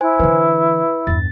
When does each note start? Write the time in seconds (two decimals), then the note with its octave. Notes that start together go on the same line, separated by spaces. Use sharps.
0.01 E4 C5 G#5
0.20 D3 E3 B4
1.07 E2 G2 A6